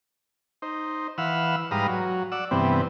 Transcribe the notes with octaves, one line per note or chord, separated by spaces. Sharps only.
D#4 C5
E3 F5 F#5 B5 E6
G#2 G3 B4 F5 A#5 D#6
F#3
D5 F#5 E6
G2 C3 E3 B3 C4